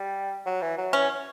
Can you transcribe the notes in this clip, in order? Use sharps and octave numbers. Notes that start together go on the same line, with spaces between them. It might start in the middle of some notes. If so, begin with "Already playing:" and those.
Already playing: G3
F#3
E3
F#3
E3 C#4